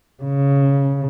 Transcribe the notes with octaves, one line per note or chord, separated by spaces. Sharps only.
C#3